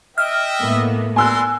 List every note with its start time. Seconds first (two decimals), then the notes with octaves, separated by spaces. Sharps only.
0.18 D#5 E5 G5 F6
0.60 A2 A#3 B3
1.16 G3 A#4 G#5 C6 E6 F#6